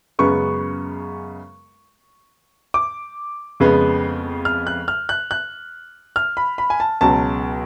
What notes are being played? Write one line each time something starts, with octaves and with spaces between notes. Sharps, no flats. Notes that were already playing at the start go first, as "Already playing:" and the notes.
F#2 C#3 G#3 B3 C#6
D6
F2 C#3 G#3 B3
F6
F#6
F6
F#6
F#6
F6
B5
B5
G#5
A5
C#2 B2 F#3 A5